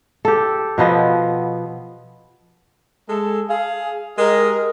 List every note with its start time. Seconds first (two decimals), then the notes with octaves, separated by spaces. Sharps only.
0.25 G4 A4
0.78 B2 F3 B3 D#5
3.09 G#3 A4
3.50 G#4 F5
4.18 G#3 G4 A#4 D#5